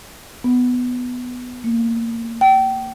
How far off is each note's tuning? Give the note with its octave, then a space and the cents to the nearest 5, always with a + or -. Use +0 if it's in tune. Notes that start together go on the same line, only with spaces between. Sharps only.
B3 +5
A#3 -20
G5 -30